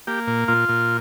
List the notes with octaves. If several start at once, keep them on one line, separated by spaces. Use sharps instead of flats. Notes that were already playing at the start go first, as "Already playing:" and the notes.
A#3 G4
A#2
A#2 F4
A#2